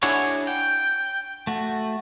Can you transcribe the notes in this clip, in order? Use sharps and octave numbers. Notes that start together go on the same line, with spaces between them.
D4 E4 F#4 G#4 C#5
G5
A3 F#4